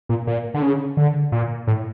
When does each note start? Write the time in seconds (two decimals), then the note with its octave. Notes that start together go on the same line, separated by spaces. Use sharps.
0.09 A#2
0.27 A#2
0.54 D3
0.62 C#3
0.97 D3
1.32 A#2
1.67 A2